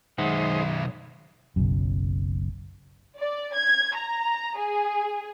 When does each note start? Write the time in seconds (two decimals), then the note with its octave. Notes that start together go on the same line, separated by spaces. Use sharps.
0.18 B1 F#2 D#3 G#3 D#4 C5 E5 F#5
1.56 F#1 B1 F#2
3.18 D5
3.55 G#6
3.95 A#5
4.57 G#4